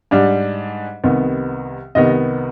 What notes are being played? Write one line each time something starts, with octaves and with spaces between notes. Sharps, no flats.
G#2 G3 D4
C2 C3 D#3 B3
C2 C3 D#3 B3 D#5